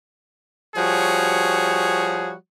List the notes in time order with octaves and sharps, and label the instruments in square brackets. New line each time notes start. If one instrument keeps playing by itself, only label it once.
[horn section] F3 G3 F#4 G#4 C#5